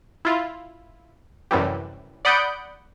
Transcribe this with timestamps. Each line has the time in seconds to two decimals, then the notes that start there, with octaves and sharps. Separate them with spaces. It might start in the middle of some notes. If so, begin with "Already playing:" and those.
0.25 E4 F4
1.51 F#2 A2 C3 E3 G3
2.25 D5 F#5 B5 D#6 G6 D7